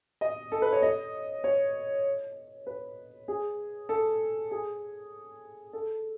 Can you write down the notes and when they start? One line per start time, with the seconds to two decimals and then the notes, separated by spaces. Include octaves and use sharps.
0.21 D#5
0.52 A4
0.62 B4
0.72 C#5
0.82 D#5
1.44 C#5
2.67 B4
3.28 G#4
3.89 A4
4.51 G#4
5.73 A4